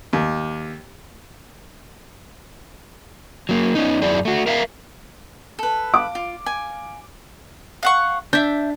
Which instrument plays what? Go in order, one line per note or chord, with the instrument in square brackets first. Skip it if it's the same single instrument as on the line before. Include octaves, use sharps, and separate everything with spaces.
[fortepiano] D#2
[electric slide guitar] F#3 A#3
B3 C#4 D#4
F#2 E4 G#4 D5
A3 F#4
A#4 E5 F5
[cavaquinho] A4 B4
[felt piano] F5 D6
[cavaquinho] F4
G#5
[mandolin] F5 F#5 C#6
[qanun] D4 [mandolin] E5 G6